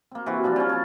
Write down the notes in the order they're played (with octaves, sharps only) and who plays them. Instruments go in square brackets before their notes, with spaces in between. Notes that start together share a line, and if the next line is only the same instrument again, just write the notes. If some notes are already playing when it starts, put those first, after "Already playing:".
[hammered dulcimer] A#3 C4
C3 E3 C4 F#4
D3 F3 G3 C4
C4 C#4
C#5 A5